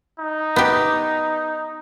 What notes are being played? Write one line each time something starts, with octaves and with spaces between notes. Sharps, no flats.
D#4
B3 G4